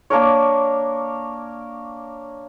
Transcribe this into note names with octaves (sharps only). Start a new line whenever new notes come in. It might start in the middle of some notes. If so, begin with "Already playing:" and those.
A#3 D4 A#4 C#5